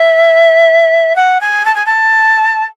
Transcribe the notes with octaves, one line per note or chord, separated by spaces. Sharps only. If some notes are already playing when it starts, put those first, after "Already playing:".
Already playing: E5
F#5
G#5
A5
G#5
A5